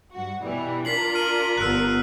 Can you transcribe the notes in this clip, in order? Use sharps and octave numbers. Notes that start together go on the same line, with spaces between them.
G2 F#4
B2 E3 G3
D4 F4 A#4 B6 C7 F#7
F6 D#7 F#7
G1 B3 E6 F#6